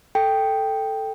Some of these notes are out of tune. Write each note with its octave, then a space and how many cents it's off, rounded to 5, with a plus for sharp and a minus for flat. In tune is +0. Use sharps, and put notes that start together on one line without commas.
A4 +0 G5 +0